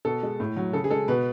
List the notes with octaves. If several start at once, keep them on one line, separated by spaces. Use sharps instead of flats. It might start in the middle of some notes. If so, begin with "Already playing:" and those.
B2 A4
G#3
A2
F#3
C#3 A4
G#4
G#3 A4
B2 B4